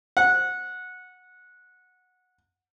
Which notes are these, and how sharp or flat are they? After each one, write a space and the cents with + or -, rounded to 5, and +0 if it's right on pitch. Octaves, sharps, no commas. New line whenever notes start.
F#5 -15